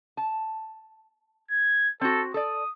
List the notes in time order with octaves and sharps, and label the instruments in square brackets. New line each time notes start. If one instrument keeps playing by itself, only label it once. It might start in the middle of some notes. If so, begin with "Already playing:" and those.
[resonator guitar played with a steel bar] A5
[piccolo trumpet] G#6
[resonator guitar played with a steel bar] C4 F#4 [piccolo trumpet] A4
[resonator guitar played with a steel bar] A4 D5 [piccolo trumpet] D#6